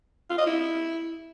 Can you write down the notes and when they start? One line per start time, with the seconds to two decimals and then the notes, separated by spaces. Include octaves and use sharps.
0.30 F4
0.38 D#5
0.46 E4